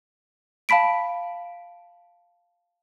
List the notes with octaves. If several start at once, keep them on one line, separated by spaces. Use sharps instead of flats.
F5 A5 B5 B6 D7